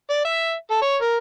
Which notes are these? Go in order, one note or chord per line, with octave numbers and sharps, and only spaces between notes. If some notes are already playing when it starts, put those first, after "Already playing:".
D5
E5
A4
C#5
A#4